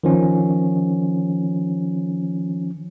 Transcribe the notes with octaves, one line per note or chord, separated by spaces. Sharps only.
D#3 F3 C#4